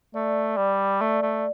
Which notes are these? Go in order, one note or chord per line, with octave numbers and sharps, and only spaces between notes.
A3 D5
G3
A3 D5
A3